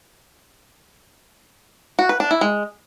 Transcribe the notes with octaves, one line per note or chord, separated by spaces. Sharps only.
F#4
B4
D4
E4
G#3